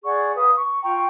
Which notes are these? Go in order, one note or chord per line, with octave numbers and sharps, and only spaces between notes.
G#4 D5 F#5 C#6
B4 F5 D#6
C#6
F4 G5 A#5 C#6